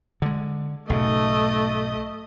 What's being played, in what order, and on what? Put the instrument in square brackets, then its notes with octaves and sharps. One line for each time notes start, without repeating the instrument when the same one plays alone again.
[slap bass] D3 G#3
[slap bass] B1 G#2 C#3 [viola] A3 D#5